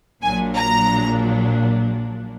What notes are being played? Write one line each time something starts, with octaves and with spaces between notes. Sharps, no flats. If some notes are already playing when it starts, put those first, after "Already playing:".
A#1 A#2 F#3 A#3 D4 G#5
A#5